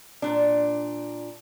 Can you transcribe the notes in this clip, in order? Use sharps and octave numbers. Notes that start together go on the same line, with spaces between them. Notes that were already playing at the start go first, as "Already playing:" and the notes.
A#2 D4